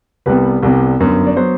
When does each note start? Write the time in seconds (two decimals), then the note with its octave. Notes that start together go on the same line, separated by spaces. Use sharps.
0.26 C2 C3 G3 B3 B4
0.63 C2 C3 G3 B3
1.00 G1 F#2 F#3 B3
1.27 D5
1.37 F#3 B3 C5